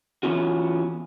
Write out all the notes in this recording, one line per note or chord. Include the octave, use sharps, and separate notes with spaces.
E3 F3 B3 C#4 F4 F#4